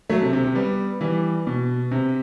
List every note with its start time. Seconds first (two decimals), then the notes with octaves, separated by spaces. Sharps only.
0.10 F#3 A3
0.22 C3
0.33 C3
0.44 C3
0.55 G3 B3
1.01 E3 G3
1.47 B2
1.91 C3